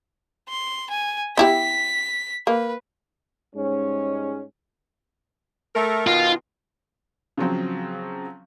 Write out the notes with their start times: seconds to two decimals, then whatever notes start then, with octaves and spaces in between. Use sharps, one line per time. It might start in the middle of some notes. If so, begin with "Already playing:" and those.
0.49 C6
0.90 G#5
1.37 B3 E4 G4 B6
2.47 A#3 B4
3.56 G#2 G3 G#3 C#4
5.75 A3 A#4
6.07 B2 D#3 F4 A#4
7.37 C#3 F3 F#3 C4